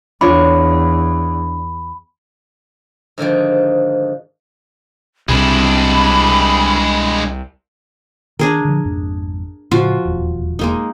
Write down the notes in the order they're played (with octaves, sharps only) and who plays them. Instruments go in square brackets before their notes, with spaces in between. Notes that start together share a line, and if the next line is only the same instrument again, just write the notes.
[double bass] E2 [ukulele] D4 F4 C#5 [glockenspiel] B5
[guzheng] G#2 D3 D#3 F3
[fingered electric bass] C2 C3 G3 [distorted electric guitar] G#3 D4 [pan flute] B5
[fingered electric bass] D#3 [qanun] D4 G#4 A#4
[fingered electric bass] D3 D#3 F3
G#1 F2 G#2
[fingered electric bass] A2 C#3 [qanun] F3 F4 F#4
[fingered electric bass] E1 D#2
[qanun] G#3 A#3 D#4